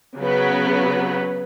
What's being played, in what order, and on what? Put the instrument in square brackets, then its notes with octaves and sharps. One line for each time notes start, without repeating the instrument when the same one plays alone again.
[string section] C#3 F#3 B3